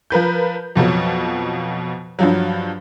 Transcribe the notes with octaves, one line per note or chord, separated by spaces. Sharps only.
F3 A#4 B4 G6
F2 B2 F3 F#3
G2 F3 F#3